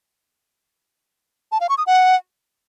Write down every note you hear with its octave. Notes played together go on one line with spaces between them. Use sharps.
A5
F5
C#6
D#6
F#5